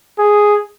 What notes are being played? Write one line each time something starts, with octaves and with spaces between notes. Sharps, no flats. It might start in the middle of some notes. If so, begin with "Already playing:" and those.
G#4